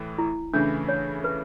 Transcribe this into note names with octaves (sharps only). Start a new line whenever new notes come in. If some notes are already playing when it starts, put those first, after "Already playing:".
Already playing: A2 E3 A3
E4
C#3 E3 A3 D4 E4
C#5
B4